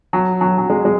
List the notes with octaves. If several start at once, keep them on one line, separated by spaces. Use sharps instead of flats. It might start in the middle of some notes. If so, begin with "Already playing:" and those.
F#3
F#3
F#3
G#3
G#3